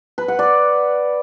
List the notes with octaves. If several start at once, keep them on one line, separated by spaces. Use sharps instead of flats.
B4
F#5
D5